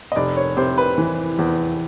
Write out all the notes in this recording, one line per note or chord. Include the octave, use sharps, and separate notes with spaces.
D#5
F1 D5
C#5
C3 C5
B4
E3
E2